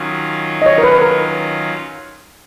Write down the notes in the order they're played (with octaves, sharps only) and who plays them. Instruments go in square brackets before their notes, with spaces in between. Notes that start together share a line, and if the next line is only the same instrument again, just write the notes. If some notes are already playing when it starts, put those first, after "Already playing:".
Already playing: [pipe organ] D#3 F#3 C#4 F4
[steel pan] D#5
C#5
A#4
B4
A#4